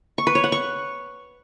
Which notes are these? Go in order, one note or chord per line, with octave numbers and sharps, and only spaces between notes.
C#6
B4
C#5
F#5
C#6